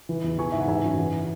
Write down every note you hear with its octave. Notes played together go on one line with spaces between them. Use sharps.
E3
E2
E3 G#5 C#6
G#2 E5
F#5
E3 E5 G#5
F#2
E3